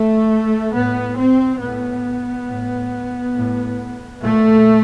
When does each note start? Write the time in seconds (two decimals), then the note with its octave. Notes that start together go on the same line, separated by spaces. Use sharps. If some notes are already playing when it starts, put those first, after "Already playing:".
Already playing: A3
0.73 A2 B3
1.17 C4
1.60 A2 B3
2.48 A2
3.35 A2
4.21 A#2 A3